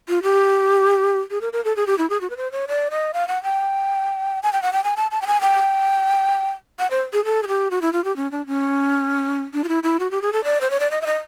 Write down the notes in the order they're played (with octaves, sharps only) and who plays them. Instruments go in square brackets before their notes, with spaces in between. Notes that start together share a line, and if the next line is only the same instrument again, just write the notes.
[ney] F4
G4
G#4
A#4
A#4
A4
G#4
G4
E4
G#4
F#4
B4
C5
C#5
D5
D#5
F5
F#5
G5
G#5
G5
F#5
G5
G#5
A5
A5
G5
G#5
G5
F#5
C5
G#4
A4
G#4
G4
F#4
E4
F4
G4
C#4
D4
C#4
D4
F4
E4
E4
F#4
G4
G#4
A4
D5
C5
C#5
D5
D#5
E5
D#5